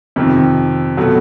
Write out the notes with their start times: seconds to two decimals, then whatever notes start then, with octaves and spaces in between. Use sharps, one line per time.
0.16 F2 C3 D#3
0.97 B2 F#3 A3